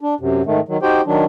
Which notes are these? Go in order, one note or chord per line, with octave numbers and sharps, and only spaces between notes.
D4
F#2 C3
G#2 D#3 A3
D#3 F#3
D#4 F#4 G4 C5 G5
D#3 F#3 D4